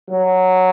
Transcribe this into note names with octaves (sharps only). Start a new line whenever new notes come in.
F#3